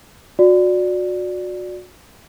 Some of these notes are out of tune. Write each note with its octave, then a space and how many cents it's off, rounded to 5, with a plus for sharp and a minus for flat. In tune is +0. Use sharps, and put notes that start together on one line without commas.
F#4 -30 D5 +0